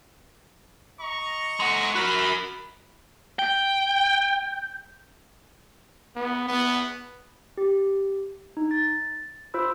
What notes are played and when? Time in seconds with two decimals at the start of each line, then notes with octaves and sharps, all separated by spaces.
1.01 D#5 A#5 C#6
1.60 G#3 F#5
1.95 F#4 A#4 B5
3.39 G5
6.16 B3
6.48 B3
7.58 G4
8.57 D#4
8.71 A6
9.54 F4 C5 B5 E6